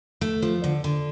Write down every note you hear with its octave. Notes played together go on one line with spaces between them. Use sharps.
A3
F3
D3
D3